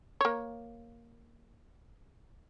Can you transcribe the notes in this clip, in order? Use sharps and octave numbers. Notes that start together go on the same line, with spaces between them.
A#3 C#5